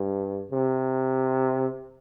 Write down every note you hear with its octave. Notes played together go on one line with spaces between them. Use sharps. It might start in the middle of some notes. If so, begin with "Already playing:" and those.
Already playing: G2
C3